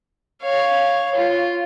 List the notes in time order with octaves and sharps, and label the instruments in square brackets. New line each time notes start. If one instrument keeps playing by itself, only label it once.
[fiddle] C#5 F5
F4